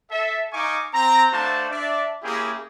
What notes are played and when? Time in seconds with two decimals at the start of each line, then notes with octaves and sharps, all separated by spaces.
0.11 A4 E5
0.53 D#4 F5 G#5 C#6 D6
0.94 C4 A#5
1.32 A3 D4 F#4 C5 F5 A5
1.71 D4 D5 E5
2.24 A#3 C#4 E4 G4 G#4